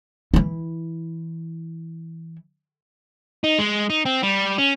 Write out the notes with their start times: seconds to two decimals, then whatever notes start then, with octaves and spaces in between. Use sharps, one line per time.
0.34 E3 E4
3.44 D#4
3.59 G#3
3.90 D#4
4.05 C4
4.23 G3
4.58 C#4